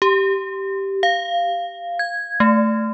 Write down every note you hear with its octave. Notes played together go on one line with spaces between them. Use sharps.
G4
F5
G#6
A3